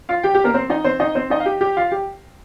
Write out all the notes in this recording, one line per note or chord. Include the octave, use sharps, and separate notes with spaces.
F4 F5
G4 G5
G4 G5
A#3 A#4
C4 C5
D#4 D#5
C4 C5
D#4 D#5
C4 C5
D#4 D#5
F5
G4 G5
G4 G5
F4 F5
G4 G5